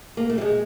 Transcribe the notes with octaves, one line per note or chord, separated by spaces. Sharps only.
A#3
A3
G3
G#3